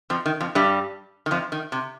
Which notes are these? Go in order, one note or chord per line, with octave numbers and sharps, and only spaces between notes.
F2 F3
D#3
F2 F3
G2 G3
D#3
F2 F3
D#3
C3